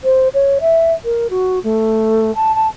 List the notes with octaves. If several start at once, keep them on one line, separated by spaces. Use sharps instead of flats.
C5
C#5
E5
A#4
F#4
A3
A5
A5